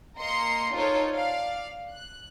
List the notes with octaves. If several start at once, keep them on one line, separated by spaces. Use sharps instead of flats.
A#3 D#5 A#5 C6 C#7
D#4 F4 A4 A#4 C5 C#5
D5 F5
F#6